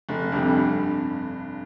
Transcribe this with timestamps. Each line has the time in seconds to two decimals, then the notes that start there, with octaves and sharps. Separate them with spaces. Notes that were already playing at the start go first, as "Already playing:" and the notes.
0.09 F1
0.32 F2 D3 G3
0.56 G2